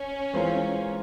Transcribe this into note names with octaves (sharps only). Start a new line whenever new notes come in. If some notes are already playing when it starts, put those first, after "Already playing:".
Already playing: C#4
E3 G#3 C4 F4 A#4